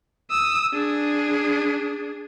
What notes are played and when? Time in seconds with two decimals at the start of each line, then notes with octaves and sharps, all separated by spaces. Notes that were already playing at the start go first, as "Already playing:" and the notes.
0.31 D#6 E6
0.74 D4 G#4